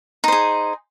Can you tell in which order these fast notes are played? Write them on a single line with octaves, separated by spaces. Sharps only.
D#4 C5 G#4